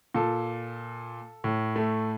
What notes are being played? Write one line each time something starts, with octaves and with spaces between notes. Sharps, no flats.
A#2 A4
A2
A3